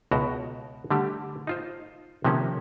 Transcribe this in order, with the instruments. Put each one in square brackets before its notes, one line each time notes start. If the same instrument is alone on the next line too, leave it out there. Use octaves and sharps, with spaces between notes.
[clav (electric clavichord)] C#2 B2 F#4 E5 G5 A#5
D3 G3 A3 G4
D#4 F4 C5
C3 D#3 F3 A#3 C#4